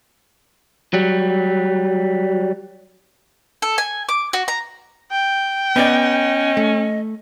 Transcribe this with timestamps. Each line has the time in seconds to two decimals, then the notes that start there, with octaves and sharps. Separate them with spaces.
0.94 F#3 G3
3.62 A4
3.78 G#5
4.09 D6
4.33 F#4
4.48 A#5
5.12 G5
5.76 B3 C#4 D5 D#5
6.57 A3